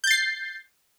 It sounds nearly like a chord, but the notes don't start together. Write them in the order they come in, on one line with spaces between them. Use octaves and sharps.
G6 A6 C7